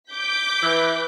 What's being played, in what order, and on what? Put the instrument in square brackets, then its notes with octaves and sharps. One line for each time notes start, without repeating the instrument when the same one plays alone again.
[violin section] D6 G6 B6
[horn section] E3